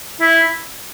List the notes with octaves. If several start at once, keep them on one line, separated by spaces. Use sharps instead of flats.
E4